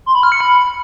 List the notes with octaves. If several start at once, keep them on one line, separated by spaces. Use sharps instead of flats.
C6
B5
F6
C#7
B5